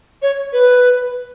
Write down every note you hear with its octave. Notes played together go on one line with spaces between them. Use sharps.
C#5
B4